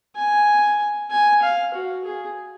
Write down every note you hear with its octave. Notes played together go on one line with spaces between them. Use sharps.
G#5
G#5
F5
F#4
G#4